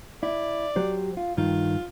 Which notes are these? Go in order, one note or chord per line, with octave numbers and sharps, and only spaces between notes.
E4 D5
F#3 G4 C5
F4
G2 D#3 F4